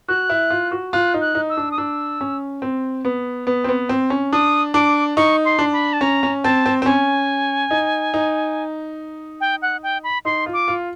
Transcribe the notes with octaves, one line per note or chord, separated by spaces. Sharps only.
F#4 F#6
E4
F4
F#4
F4 F#6
D#4
F#6
D#4
E6
D4
D#6
D4 E6
C#4
C4
B3
B3
C4
B3
C4
C#4
D4 D#6
D4 D6
D#4 C#6
C6
D4
B5
A5
C#4 A#5
C#4
C4 A5
C4
C4
C#4 G#5
D#4
D#4
G5
F#5
G5
B5
D#4 C6
F4
D6
F4